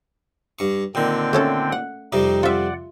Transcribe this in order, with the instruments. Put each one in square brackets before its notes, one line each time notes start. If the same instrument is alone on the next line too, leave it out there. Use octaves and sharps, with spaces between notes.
[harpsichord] G2 C#6
[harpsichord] A#2 D#3 [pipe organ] D3 C4 G5
[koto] A3 C#4 A4
F#5
[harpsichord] F2 C3 G3 [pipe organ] D#4
[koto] F4 E5 [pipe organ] D5 F#5